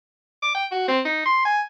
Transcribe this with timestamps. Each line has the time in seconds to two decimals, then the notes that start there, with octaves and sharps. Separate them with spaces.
0.43 D6
0.55 G5
0.72 F#4
0.88 C4
1.05 D#4
1.26 C6
1.45 G#5